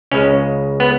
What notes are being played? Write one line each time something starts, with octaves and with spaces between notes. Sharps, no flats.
C#2 C#3 G#3 C#4
B3